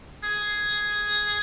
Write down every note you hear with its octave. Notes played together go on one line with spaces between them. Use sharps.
G#4